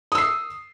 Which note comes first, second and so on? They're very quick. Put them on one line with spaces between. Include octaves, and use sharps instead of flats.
D#6 E6 C7